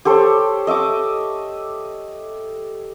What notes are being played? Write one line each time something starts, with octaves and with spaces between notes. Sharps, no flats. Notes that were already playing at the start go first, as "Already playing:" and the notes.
G4 A4 C5 C#5
D#5 E5 C#6 D6